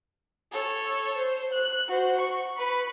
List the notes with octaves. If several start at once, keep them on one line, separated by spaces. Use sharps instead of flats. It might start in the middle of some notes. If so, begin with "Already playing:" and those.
A4 C#5
C5
F#6
F#4 C5
C#6
B4 B5